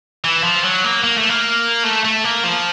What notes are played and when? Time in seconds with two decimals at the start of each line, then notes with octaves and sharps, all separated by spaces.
0.24 E3
0.44 F3
0.64 F#3
0.84 A#3
1.04 A#3
1.17 A3
1.29 A#3
1.84 A3
2.05 A3
2.24 A#3
2.44 F3